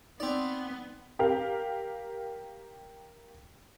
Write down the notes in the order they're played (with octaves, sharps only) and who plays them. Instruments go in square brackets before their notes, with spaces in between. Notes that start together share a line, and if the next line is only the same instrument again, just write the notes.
[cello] B3 [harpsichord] C4 D5 [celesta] D#4 D#6 F7
[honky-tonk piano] G4 A#4 F5